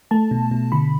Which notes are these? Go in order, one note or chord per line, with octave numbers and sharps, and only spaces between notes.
A3 A5
B2
B2
D3 B5